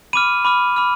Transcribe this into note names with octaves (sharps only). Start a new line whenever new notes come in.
B5 D6 F6 D#7
B5 D6 F6
B5 D6 F6